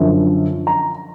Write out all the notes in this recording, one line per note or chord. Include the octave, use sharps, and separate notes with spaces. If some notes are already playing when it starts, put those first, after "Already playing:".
Already playing: F#2 D3 F3
A#5